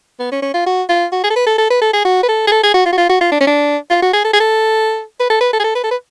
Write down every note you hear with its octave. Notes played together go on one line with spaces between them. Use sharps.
B3
C#4
C#4
F4
F#4
F4
F#4
G#4
A4
B4
A4
A4
B4
A4
G#4
F#4
B4
A4
G#4
A4
G#4
F#4
F4
F#4
F4
F#4
F4
D4
C#4
D4
F4
F#4
G#4
A4
G#4
A4
B4
A4
B4
A4
G#4
A4
B4
A4
B4